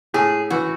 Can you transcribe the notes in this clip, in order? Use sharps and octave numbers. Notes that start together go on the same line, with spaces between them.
A2 G#4
E3 F#4